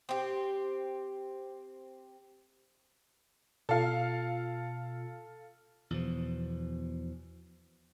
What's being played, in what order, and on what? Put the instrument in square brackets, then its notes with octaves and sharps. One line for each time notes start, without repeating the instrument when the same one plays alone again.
[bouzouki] C4 G4
[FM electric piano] B2 F4 [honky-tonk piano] A4 F5
[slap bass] E2 B2 F3